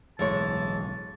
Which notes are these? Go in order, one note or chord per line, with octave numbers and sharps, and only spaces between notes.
D1 B1 E3 G#3 C#5 A5